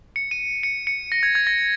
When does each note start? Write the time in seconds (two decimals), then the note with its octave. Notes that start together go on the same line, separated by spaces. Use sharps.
0.16 C#7
0.31 D#7
0.63 C#7
0.87 C#7
1.12 A#6
1.23 G#6
1.35 G#6
1.47 A#6